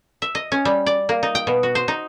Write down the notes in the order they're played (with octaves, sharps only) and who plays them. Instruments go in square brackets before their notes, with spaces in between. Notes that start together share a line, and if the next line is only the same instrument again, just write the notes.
[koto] E5
D#5
C#4
G3
D5
A#3
D#4
G5
B2
F#4
C5
D#4